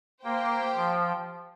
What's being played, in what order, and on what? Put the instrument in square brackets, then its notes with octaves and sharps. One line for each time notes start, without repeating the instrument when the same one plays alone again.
[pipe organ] A#3 [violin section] G4 C5 G5
[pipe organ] F3